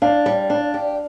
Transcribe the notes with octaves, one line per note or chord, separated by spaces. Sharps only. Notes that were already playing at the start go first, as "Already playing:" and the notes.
D4 F5
G3
D4
G4